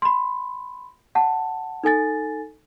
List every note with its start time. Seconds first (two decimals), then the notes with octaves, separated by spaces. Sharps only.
0.02 B5 C6
1.15 F#5 A5
1.84 D#4 A4 G#5 A6